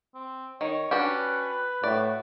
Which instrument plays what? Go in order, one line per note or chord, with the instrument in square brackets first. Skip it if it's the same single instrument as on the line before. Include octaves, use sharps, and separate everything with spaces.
[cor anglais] C4
[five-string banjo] D#3 [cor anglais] C#5
[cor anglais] C#4 [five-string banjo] D4 F#4 G4 [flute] B4
[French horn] A2 [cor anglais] F#4 [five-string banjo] D5